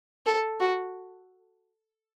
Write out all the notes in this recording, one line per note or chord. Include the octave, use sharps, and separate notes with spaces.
A4
F#4